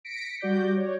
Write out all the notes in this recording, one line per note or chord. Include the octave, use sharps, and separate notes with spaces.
A#6 B6 C#7 D7
G3 F#4 D5 D6 G6 A#6
C#5 D5